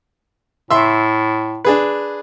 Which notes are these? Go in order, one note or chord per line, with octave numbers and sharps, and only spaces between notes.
A2 E5 C6
D4 G#4 B4